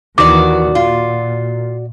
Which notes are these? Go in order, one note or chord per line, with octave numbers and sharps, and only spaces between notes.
D#2 D#3 E3 F#4 D5 D6
A#2 F4